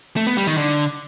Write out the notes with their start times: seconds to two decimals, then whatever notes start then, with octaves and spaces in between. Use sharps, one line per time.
0.17 A3
0.27 B3
0.37 G3
0.47 D#3
0.57 D3